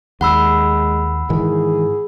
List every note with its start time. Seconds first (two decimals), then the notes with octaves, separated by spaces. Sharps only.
0.21 D#2 G#3 F#5 B5 E6
1.30 G#2 D#3 E3 G#4